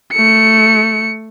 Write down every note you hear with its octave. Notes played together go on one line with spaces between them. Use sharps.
A3 C#7